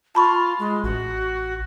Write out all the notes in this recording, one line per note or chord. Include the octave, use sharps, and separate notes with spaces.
F4 A5 B5 C#6
G#3
A1 F#4